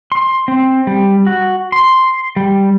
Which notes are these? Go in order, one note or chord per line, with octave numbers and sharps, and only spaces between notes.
C6
C4
G3
F#4
C6
G3